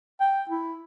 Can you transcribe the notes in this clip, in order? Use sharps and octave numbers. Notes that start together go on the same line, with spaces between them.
G5
E4